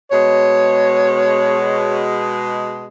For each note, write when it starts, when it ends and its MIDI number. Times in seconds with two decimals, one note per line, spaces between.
0.11 2.85 47
0.11 2.85 56
0.11 2.03 73